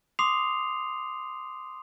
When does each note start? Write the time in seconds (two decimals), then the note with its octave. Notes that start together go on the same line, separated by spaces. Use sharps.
0.19 C6 D6 D#6 C7 F7